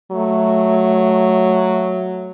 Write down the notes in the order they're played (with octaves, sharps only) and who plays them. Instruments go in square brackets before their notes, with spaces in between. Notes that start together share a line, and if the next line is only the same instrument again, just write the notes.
[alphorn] F#3 [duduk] A3